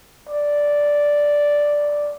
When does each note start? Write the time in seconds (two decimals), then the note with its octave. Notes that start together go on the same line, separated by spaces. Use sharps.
0.29 D5